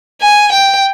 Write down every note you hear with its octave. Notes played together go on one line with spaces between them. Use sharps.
G#5
G5